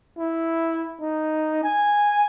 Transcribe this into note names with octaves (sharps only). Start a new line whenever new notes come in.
E4
D#4
G#5